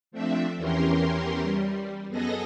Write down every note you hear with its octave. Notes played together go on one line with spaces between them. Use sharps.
F3 A3 C4 D4 E5
E2 E3 C#4 G4 A#4 C6
G3
F#2 B3 G#4 A4 D#5 A#6